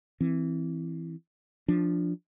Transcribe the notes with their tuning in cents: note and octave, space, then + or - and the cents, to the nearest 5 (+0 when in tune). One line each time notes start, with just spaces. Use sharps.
E3 +0 C4 +0
F3 +0 D4 +0